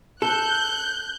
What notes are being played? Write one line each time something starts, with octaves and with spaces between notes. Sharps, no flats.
A4 F#6 G6